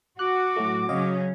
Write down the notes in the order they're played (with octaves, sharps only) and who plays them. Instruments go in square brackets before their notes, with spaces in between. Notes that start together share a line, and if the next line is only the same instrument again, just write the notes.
[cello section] F#4 [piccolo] D6 [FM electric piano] F#6
[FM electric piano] A2 F#3 A3
[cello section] C#3 F#3 C#4 [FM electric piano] F#4 D#5 F5